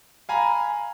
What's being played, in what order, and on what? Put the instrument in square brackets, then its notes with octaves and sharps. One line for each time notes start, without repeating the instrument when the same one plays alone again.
[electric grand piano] F5 G#5 A#5 B5